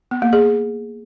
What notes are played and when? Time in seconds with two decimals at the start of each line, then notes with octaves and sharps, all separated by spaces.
0.11 B3
0.22 A#3
0.33 G#4